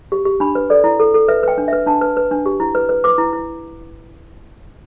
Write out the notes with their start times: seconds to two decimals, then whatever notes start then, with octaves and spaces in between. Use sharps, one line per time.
0.12 G4
0.25 G4
0.40 D4 B5
0.55 B4
0.70 A4 D5
0.84 E4
1.00 A4
1.14 A4
1.28 B4 E5
1.43 B4 G5
1.58 D4
1.68 B4 E5
1.86 D4 A5
2.01 B4
2.17 B4
2.31 D4
2.46 G4
2.60 E4
2.75 B4
2.89 B4
3.04 B4 D6
3.18 E4
3.33 E4